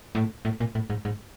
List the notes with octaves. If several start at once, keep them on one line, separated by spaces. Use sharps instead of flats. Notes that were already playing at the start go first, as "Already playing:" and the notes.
A2
A2
A#2
A2
G#2
G#2